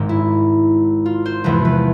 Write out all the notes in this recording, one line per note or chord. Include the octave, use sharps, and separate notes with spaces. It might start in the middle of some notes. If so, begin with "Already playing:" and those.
Already playing: G#1 G#2 G#3
E4
F4
C5
F1 E2 C3 E3 G#3 B4
B4